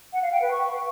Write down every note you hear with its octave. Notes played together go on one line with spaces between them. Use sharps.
F#5
F5
G5
B4
C#6